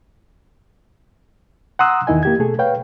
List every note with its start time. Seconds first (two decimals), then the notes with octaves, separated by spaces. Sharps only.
1.79 F#5 A#5 C6 D#6 E6 F#6
2.07 E2 D#3 E4 D#5 G#5
2.23 A#3 G4 G#6
2.39 B2 A3 G#4 A4
2.59 B4 C#5 F5 G5